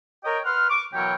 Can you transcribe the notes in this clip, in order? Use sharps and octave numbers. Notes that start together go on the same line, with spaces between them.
A#4 C#5 D#5 G5
B4 F#5 C6 F6
C#6 D6
B2 E3 F#3 A#4 C#5 G5